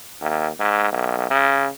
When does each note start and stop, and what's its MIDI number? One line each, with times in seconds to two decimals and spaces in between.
0.21 0.49 39
0.60 0.90 44
0.92 1.28 35
1.30 1.68 49